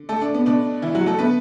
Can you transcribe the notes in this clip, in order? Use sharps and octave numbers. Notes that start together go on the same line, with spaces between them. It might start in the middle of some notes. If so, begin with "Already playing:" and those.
Already playing: D3
A3 A4
D4
B3
B2 A3 D4
E3 E4
F#3 F#4
A3 A4
D3 A3 B3 B4